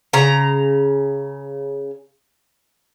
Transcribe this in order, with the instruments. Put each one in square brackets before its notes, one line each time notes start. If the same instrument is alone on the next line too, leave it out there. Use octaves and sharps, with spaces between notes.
[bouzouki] C#3 A#5